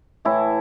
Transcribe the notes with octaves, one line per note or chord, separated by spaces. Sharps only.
A2 E3 A3 E4